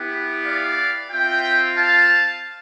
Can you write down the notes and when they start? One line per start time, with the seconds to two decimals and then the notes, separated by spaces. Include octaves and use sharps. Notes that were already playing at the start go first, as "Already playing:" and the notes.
Already playing: B3 E4 G4
0.44 D5 F5
1.10 C4 F4 E5 G5
1.77 F5 A5